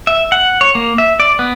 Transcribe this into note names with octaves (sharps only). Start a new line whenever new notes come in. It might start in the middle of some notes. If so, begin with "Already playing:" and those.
E5
F#5
C#5
A#3
E5
D5
B3